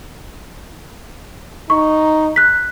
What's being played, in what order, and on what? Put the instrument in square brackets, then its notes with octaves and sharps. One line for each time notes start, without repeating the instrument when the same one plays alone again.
[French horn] D#4 [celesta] C#6
[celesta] F#6 B6